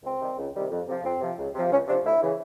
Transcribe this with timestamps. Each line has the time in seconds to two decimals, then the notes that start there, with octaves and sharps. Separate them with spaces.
0.03 C#2 C4
0.20 C3 D#3 G3
0.37 C#2
0.54 C3 D#3 G3
0.70 F2
0.87 C3 F3
1.03 F2 C4
1.21 C3 F3
1.37 C#2
1.55 C3 F3
1.71 C#2 C#4
1.87 C3 F3 D4
2.04 D2 E4
2.21 C#3 E3